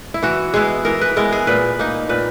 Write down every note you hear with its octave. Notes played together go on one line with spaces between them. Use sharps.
E4
E3 F#4
G#3 B3 E4 G#4
E3 A#4
B4
G#3 B3 E4 A#4
G#4
A#2 B4
A#3 D#4
A#2 B4